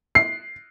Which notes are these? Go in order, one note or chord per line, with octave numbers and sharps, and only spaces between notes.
C7